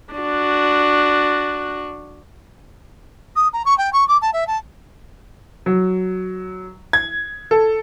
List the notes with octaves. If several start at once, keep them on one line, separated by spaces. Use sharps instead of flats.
D4 F#4
D#6
A#5
C#6
G5
C#6
D6
A5
E5
A5
F#3
G#6
A4